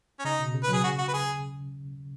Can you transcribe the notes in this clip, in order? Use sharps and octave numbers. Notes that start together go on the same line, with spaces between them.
C#4
C#3 D#4
B2
C#3
B4
F#3
G#4
C#3 F#4
F#4
B4
G#4